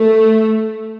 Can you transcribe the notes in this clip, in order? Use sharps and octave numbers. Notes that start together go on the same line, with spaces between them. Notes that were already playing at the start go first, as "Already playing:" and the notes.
Already playing: A3